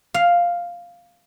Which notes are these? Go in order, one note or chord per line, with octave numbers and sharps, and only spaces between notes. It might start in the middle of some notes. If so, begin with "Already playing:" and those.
F5